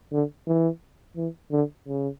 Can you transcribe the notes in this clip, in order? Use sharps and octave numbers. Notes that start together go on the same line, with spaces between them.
D3
E3
E3
D3
C#3